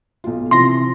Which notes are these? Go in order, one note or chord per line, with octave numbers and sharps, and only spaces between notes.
B1 F4
C3 E3 F3 C6 A#6